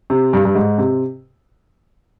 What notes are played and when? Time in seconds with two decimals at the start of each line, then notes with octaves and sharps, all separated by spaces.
0.10 C3
0.33 G2
0.45 G2
0.55 G#2
0.78 C3